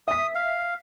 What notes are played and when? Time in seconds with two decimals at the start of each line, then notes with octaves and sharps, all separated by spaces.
0.08 E5 D#6 B6
0.35 F5